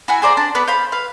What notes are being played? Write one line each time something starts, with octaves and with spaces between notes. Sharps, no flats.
E4 F#4 G#5
G#4 C5 D5 A#5
D4
B3 B4 D5
C5 F5 B5
B4 F5